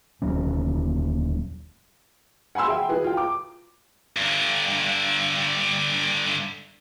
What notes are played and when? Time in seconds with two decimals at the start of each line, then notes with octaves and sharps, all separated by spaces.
0.22 D#1 F#3 C#4
2.55 F#5 G#5 B5 C6 E6
2.67 G#4 E5 G5
2.89 E4 G#4 B4
3.04 F4 G5
3.17 D6
4.17 G2 D3